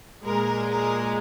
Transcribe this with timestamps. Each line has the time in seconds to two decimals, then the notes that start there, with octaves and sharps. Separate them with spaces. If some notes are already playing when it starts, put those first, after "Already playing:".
0.22 A#2 G#3 A#4
0.68 A#4